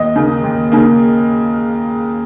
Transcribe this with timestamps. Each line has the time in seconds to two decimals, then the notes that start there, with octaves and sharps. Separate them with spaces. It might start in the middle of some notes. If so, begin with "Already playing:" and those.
Already playing: D#2 D#5
0.16 C#3 A#3
0.44 D#2
0.72 C#3 A#3